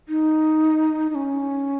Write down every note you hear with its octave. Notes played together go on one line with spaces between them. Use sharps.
D#4
D#4
C#4